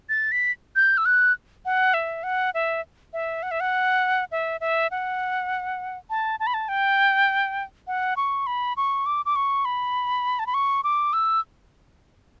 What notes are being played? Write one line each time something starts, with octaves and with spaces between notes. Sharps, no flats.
A6
B6
G6
E6
F#6
F#5
E5
F#5
E5
E5
F#5
E5
F#5
E5
E5
F#5
A5
A5
B5
A5
G5
F#5
C#6
B5
C#6
D6
D6
C#6
B5
A5
B5
C#6
D6
E6